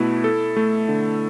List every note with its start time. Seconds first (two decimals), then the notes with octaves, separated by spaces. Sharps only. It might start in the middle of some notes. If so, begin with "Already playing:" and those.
Already playing: B2 A3 E4 B4
0.24 A4
0.56 A3
0.88 D3